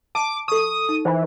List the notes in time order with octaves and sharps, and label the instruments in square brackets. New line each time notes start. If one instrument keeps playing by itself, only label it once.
[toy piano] A5 [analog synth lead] D6
[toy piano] A4 C#6 [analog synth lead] D#6
[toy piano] D#4
[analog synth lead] E3 [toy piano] C5